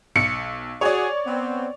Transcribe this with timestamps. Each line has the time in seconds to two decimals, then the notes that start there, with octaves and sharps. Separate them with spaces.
0.16 B1 C#7
0.81 F#4 G#4 C#5 D5
1.26 B3 C4